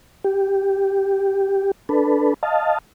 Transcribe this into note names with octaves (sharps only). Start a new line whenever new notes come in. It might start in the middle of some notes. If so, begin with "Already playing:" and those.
G4
D4 A4 B4
D#5 F5 A5